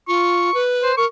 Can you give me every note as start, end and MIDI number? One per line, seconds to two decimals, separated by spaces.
0.08 0.53 65
0.08 0.59 85
0.54 0.92 71
0.83 0.97 72
0.97 1.06 70
0.97 1.05 85